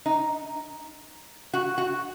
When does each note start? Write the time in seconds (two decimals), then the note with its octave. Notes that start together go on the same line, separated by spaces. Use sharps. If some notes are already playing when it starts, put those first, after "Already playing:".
0.06 D#4
1.54 F#4
1.78 F#4